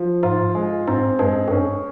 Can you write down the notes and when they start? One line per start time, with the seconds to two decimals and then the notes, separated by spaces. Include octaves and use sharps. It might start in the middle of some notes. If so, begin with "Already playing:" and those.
Already playing: F3
0.23 G#2 F4
0.55 G#3
0.88 G#2 C4
1.19 G2 G#3
1.48 F2
1.51 G2 C#4